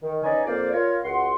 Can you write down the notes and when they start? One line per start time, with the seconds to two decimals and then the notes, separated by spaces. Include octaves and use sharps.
0.03 D#3
0.24 C#4 D#4 B4 D5 D#5 G#5
0.46 F2 A#3 C5 D5
0.72 F4 A#4 C#5
1.04 C#2 F#4 F#5 C6